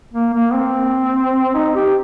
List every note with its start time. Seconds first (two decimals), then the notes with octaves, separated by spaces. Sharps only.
0.13 A#3
0.34 A#3
0.53 C4
1.55 D#4
1.75 G4